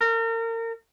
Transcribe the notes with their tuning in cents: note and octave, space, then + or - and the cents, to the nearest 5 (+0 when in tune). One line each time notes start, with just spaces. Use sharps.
A#4 -35